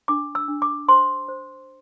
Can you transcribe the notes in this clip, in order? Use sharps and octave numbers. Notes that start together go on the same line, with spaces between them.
D4 D6
E6
D4
D6
C5 C6
C5